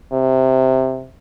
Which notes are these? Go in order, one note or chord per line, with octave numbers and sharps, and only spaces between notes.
C3